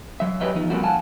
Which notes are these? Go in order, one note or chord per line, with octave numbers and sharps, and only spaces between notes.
F#3 E5
E4 G4 B4 C#5 D#5 E5
E2 F3 D#4
F3 G3 A#3 C4 E4 F#4
F5 F#5 G#5 A5